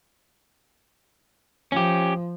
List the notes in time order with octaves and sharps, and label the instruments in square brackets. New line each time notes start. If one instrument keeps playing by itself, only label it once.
[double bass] F3 [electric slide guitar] C#4 G4